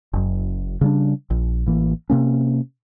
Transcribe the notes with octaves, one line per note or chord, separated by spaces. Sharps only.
F#1 F#2
C#3 G3 D4
A#1
A1 E3 A#3
C3 A#3 C#4